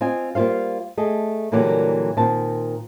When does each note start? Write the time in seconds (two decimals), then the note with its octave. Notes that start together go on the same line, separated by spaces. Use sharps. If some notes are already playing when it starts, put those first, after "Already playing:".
0.01 C4 F4 D#5 G#5
0.35 G3 A#3 F4 C5 F5
0.98 A3 G#4 D#5
1.52 A#2 D3 E3 F#3 G3 A#3
2.17 A#2 D#3 C4 C5 A5